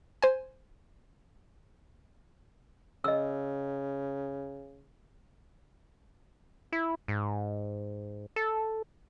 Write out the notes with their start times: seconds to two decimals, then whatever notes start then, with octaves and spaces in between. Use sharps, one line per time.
0.22 C5 G#5
3.04 C#3 D#5 E6
6.72 E4
7.08 G#2
8.36 A4